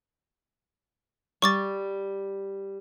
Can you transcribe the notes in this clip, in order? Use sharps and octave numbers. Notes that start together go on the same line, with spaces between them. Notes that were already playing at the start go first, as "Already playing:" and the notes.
G3 C#6 D6 A6